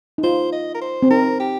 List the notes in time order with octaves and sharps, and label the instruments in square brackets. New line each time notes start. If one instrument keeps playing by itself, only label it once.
[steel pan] D#4
[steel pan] F4 [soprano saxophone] C5
[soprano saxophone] D#5
A#4
C5
[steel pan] C4
[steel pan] D#4 [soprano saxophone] A#4
[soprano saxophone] G4